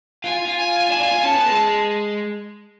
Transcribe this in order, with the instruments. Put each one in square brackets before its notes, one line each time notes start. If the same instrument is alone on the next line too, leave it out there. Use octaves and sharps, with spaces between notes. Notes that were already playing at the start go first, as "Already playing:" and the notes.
[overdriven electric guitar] F4 [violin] G#5
[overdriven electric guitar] F4
[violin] G#5
[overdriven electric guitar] D4
F4
F4
[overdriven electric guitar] C#4 [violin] A5
[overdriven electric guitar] B3
G#3